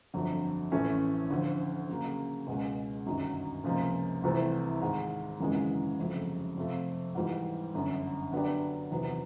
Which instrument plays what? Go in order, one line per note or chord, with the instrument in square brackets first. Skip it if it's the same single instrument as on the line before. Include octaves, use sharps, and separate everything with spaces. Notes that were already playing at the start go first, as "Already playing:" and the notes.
[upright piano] G1 F2 D3 F#3
A1 A2 E3 A3 C#4
D2 D3 F3
C#3 F#3 A#3
C#2 B2 G#3
G1 F#2 D#3 F#3
C#2 C3 F3 A#3 D#4
C2 C3 E3 A3 C4
G#2 D#3 G#3
G#1 F#2 C#3 E3 G#3
G1 F2 C#3 F#3 A3
F2 C3 F3 A3
G#2 E3 G3
G1 F#2 D3
D3 F#3 B3 D4 G4
E2 C3 D#3 F#3 B3